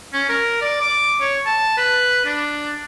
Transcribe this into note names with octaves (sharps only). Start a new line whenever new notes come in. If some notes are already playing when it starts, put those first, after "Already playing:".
C#4
A#4
D5
D6
C#5
A5
B4
D4